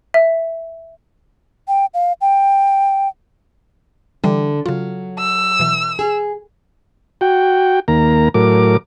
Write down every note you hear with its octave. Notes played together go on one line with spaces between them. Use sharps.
E5
G5
F5
G5
D3 E3 G3 D4
C#3 F#3 F4
E6
B2 E3
G#4
F#4 G5
D#2 A#3 A#5
A2 F#3 A#4 D6